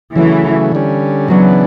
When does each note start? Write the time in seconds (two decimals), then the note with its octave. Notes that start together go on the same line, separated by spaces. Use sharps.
0.15 C#3 E3 F#3 A3
0.72 D3 G3 C#4
1.28 C#3 E3 F#3 B3 D4